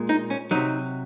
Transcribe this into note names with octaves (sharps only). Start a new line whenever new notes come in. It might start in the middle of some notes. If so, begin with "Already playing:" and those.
Already playing: A#2 G#3
D#4
C#4
C3 F#3 D#4